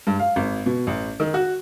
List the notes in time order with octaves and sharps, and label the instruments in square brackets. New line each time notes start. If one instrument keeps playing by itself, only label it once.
[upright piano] G2
F5
G#1
B2
A1
D#3
F#4